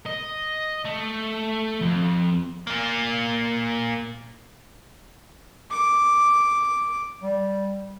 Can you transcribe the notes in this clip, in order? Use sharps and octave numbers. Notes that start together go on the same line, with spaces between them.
D#5
A3
F2
A#2 A#3
D6
G3